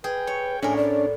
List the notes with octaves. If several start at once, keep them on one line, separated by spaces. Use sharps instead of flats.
G#4 B4 G5
C#5
A2 C#4 D4 A#4 G#5
D5